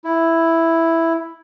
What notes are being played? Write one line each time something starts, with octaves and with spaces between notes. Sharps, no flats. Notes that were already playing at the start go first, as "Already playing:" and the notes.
E4